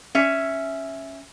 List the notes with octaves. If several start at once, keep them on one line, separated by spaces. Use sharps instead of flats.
C#4 E5